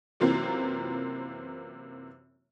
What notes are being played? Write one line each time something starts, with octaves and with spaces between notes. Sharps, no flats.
F#2 C3 E3 A#3 C4 F4